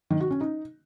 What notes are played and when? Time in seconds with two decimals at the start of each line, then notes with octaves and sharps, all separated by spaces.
0.10 D#3
0.21 F#4
0.31 C#4
0.41 D#4